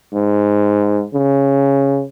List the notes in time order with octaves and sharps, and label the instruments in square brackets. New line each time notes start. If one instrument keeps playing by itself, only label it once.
[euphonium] G#2
C#3